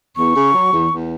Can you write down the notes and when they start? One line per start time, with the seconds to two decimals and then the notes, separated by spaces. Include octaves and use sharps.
0.17 E2 C#6
0.36 C#3
0.54 F#3
0.73 E2
0.91 E2